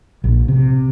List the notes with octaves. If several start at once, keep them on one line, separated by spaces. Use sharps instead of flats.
A#1
C3